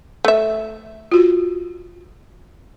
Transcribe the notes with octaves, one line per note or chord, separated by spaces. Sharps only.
A3 E5
F4 F#4